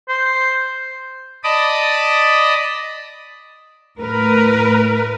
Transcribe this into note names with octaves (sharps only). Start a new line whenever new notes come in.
C5
D5 D#5 A5 B5 D6 D#6
A2 A#4 B4